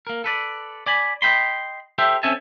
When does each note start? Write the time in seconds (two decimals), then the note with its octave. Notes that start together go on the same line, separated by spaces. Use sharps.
0.07 A#3 A#4
0.24 A4 B4 D5
0.86 D5 G#5 B5
1.22 D#5 E5 G5 B5 C6
1.98 G4 A4 C5 E5 G5
2.23 C4 C#4 A4 E5 G#5 A5